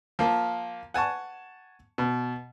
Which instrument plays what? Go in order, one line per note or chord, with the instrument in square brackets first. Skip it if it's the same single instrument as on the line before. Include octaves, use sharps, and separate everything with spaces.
[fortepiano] F3 A#3
F#5 G#5 A5 C#6
B2